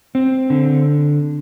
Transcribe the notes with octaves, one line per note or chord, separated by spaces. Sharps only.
C4
D3